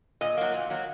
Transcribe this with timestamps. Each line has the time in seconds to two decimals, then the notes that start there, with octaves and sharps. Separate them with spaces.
0.21 A#2 D#5
0.37 F#3 A#3
0.54 A#2
0.70 F#3 A#3